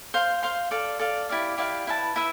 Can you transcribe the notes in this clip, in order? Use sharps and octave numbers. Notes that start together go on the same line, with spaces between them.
C5 F5 C6
C5 F5 C6
A4 D5 F5
A4 D5 F5
E4 G4 D5 F5
E4 G4 D5 F5
E4 B4 E5 A5
E4 B4 E5